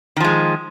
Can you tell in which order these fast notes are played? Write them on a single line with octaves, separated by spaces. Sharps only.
D#3 F3 G#3